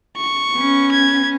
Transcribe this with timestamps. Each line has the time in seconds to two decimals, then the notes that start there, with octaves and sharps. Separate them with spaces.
0.17 C#6
0.53 B3 C#4
0.92 G#6